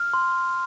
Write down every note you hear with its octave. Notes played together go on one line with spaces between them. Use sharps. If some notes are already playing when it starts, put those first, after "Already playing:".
Already playing: F6
C6